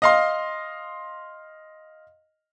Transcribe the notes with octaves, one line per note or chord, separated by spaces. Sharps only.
D#5 F5 C6